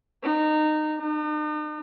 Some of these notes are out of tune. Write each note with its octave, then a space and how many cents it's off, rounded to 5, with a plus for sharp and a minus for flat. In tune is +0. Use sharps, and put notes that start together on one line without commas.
D#4 -20
D#4 -45